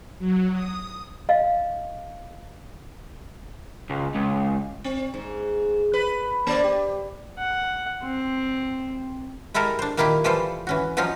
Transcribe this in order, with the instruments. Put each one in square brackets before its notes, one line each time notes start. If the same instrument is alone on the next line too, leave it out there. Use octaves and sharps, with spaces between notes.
[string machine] F#3
D#6
[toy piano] D#5 F5
[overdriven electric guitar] C#2
C#2
[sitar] C4
G#2
B4
A#3 C5 D5
G4
[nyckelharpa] F#5
C4
[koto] G#3 E4 G4 A4 A#4
D4 C5
A#2 D#3 A#3 E4 F4 G4
E3 F3 G3 F4 A4 C5
E3 C#4 F#4
F3 F#3 C#4 D#4 F4